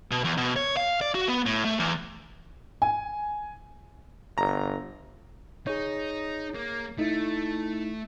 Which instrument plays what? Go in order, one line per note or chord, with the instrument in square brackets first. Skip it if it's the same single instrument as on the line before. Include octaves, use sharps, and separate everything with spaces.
[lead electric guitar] B2
E2
B2
C#5
F5
D5
F#4
B3
A2
A3
E2
[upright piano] G#5
[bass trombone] G1 [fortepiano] A#5
[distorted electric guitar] D#4 [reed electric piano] G#4 C#5
[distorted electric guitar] A#3
[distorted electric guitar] A3 [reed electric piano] D#4 E4